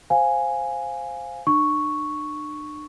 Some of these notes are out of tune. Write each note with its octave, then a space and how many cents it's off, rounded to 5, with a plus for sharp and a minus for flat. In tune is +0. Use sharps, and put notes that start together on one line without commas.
C5 +0 F5 +5 G#5 -5
D4 +45 C#6 +0